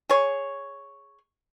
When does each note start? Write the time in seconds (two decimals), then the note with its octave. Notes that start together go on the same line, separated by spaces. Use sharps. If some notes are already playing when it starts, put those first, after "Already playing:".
0.10 G#4 C#5